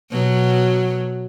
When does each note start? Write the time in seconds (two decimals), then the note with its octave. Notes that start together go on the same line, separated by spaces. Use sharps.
0.11 B2 F#3